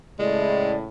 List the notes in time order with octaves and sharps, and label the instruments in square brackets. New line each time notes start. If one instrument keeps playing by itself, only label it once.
[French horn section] A2 C#3 [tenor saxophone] G#3 [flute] D5